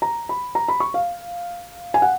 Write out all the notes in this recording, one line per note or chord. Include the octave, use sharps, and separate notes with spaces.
A#5
B5
A#5
B5
C#6
F5
G#5
F#5